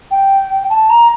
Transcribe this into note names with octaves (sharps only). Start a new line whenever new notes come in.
G5
A5
A#5